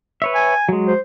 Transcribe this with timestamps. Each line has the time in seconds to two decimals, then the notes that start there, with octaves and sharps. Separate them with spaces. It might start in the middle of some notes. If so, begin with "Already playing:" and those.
0.22 B4 C#5 E5
0.35 G#5
0.69 F#3 G#3
0.86 C5